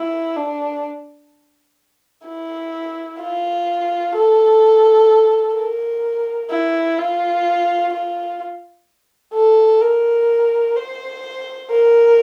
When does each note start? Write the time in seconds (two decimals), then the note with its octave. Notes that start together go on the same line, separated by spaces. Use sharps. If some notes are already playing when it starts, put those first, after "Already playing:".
Already playing: E4
0.36 D4
2.26 E4
3.20 F4
4.15 A4
5.56 A#4
6.50 E4
6.99 F4
7.93 F4
9.34 A4
9.81 A#4
10.76 C5
11.70 A#4